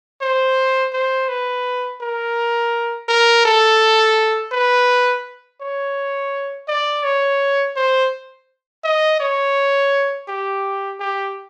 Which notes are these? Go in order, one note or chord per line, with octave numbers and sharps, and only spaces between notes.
C5
C5
B4
A#4
A#4
A4
B4
C#5
D5
C#5
C5
D#5
C#5
G4
G4